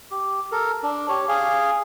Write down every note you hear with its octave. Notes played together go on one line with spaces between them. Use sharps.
G4
A4 A#4
D4
G4 C#5
G#4 F5 G#5